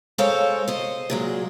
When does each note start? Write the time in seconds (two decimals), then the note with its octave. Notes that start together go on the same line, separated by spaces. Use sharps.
0.18 G#3 A4 A#4 C5 C#5 F5
0.68 C5 D#5
1.10 A#2 F#3 G#3